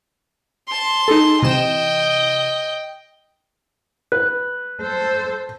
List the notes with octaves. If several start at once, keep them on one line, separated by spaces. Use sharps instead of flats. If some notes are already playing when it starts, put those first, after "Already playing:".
A5 C6
D#4 G#4 A4
C3 E3 D#5 G5 E7
B4 F#6
A4 C5